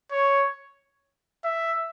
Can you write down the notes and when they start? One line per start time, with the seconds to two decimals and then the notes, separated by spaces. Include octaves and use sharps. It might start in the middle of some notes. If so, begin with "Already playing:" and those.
0.12 C#5
1.45 E5